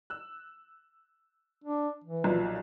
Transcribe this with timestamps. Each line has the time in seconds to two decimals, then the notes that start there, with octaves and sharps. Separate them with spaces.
0.10 E6 F#6
1.64 D4
2.04 E3
2.24 B1 A#2 F3